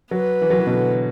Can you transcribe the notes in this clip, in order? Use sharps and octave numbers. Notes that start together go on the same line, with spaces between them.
F#3 B4
E3
F#3
E3
B2
D3